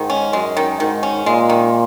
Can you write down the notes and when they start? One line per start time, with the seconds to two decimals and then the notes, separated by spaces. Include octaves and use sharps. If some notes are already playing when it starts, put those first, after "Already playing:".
Already playing: G#2 D#3
0.10 C#4
0.33 F#2 G#3
0.57 D#3
0.80 G#2 D#3
1.03 C#4
1.25 A#2 G#3
1.50 D#3